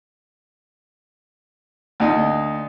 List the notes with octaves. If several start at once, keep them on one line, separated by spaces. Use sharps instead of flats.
D2 D#4